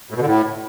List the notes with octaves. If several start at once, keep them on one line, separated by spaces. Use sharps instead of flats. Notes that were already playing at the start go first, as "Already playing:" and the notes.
A2
B2
D3
A2